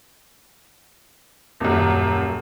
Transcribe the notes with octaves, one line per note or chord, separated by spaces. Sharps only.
D#1 F#2